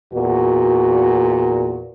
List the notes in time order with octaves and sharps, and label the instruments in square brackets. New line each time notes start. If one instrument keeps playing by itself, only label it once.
[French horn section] E2 A#2 F#4